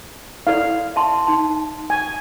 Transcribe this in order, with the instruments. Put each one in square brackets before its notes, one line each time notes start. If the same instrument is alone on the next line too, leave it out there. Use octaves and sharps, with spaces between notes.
[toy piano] E4 A4 D5 [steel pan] F5
[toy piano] E5 A5 C6
D#4 A5
[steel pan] G#5